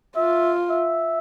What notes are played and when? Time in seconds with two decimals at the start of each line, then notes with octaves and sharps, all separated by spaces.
0.16 F4 E5
0.70 E5